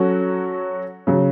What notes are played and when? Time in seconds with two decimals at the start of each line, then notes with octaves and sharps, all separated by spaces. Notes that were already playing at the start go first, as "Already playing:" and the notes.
Already playing: F#3 C#4 F#4 A4
1.07 C#3 F#3